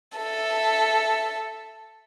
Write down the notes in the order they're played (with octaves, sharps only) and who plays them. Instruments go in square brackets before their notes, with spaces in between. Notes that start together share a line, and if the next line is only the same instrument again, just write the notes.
[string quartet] A4 E5